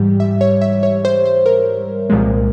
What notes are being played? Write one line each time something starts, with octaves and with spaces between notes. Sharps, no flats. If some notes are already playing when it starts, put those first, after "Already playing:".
Already playing: G#2 E3 G3 G4
E5
C#5
E5
C#5
C5
C5
A#4
C2 A#2 F3 G#3